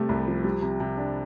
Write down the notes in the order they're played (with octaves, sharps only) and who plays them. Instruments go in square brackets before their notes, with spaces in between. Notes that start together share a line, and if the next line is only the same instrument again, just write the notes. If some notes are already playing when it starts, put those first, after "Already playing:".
Already playing: [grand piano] C3 G3 A3
C2
F3
G3
C3
C3
D4